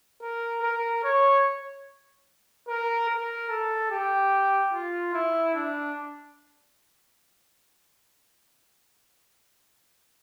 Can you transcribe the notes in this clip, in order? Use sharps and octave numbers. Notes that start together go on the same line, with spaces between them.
A#4
A#4
C#5
A#4
A#4
A4
G4
F4
E4
D4